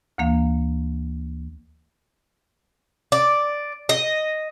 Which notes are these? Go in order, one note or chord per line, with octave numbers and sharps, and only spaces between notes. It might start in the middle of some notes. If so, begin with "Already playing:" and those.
D2 E3 A#3 F5
D5
D#5